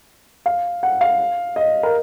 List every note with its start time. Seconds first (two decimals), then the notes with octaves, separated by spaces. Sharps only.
0.46 F5
0.83 F#5
1.01 F5
1.56 D#5
1.83 A#4